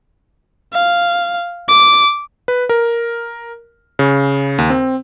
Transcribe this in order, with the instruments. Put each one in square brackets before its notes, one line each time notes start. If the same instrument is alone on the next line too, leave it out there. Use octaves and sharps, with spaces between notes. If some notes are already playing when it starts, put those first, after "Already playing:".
[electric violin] F5
D6
[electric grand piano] B4
A#4
C#3
D#2
C4